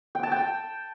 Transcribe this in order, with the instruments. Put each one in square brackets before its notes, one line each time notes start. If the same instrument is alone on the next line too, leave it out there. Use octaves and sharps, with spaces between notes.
[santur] G5
A5
G5